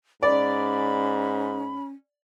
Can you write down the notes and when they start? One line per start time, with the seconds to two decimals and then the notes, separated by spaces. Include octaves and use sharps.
0.23 G#2 C#4 D5 B5